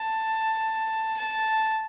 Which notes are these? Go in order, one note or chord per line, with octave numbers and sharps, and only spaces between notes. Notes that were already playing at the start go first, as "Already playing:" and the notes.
Already playing: A5
A5